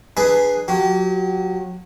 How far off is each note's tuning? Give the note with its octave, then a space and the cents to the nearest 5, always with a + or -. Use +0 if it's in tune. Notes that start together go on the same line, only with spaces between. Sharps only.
D4 +30 G#4 +0 B4 +0
F#3 -25 G4 -40